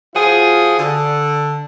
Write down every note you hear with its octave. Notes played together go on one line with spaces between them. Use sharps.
F3 F4 F#4 G#4
D3